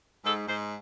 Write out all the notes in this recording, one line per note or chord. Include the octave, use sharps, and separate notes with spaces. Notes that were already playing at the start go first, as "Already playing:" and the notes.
G#2 A4
G#2 C5